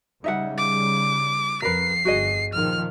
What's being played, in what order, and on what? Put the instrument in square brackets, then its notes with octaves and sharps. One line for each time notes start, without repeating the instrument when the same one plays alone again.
[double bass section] C#3 G3 [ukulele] D#4 E5 F#5
[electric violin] D6
[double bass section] F2 [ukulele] A#4 B4 [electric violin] C7
[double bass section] G1 [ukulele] F#4 G#4 D#5
[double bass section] A#2 D#3 F3 [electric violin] F6